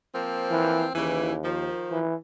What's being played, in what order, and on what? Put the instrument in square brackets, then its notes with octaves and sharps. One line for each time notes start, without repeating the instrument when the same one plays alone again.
[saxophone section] F3 A#3 C4
[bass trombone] E3
[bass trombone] D#2 [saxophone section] C#3 E3
[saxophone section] D#3 F3
[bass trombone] E3